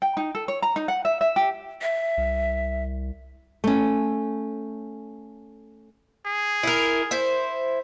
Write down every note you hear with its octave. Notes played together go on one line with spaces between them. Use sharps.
G5
D#4
A4
C#5
A#5
D#4
F#5
E5
E5
G4
E5
C2
A3 C#4
G#4
E4 A#4
E4 C5